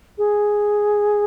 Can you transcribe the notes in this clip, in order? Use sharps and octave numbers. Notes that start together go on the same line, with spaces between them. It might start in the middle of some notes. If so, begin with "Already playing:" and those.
G#4